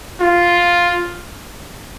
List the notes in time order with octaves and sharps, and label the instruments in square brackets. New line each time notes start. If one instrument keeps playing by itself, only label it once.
[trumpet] F4